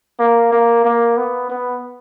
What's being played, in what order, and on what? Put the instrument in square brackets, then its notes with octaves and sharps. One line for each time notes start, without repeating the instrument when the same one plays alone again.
[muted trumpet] A#3
A#3
A#3
B3
B3